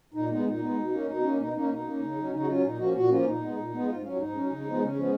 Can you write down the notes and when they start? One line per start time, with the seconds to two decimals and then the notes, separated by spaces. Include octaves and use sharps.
0.14 A#2 D#4
0.29 G#3 B3 D#4
0.44 A#2 D#4
0.60 G#3 B3
0.76 B2
0.91 A#3 C#4
1.06 B2 D#4
1.22 A#3 C#4
1.38 B2 D#4
1.53 A#3 C#4 D#4
1.69 B2 D#4
1.84 A#3 C#4
2.00 C#3
2.16 F#3 C#4
2.31 C#3 D#4
2.40 F#4
2.47 F#3 C#4 F4
2.62 A#2 D#4
2.78 F3 A#3 C#4 F#4
2.93 A#2 F#4
3.09 F3 A#3 C#4 F4
3.24 A#2 D#4
3.40 G#3 B3
3.56 A#2
3.71 G#3 B3
3.86 G#2 F4
4.02 F#3 C#4 F4
4.12 F4
4.18 G#2 D#4
4.33 F#3 C#4
4.49 C#3
4.65 F3 G#3 B3
4.80 C#3 C#4
4.96 F3 G#3 B3